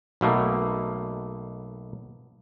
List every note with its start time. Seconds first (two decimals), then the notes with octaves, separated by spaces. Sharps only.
0.21 B1 B2 A3 A#3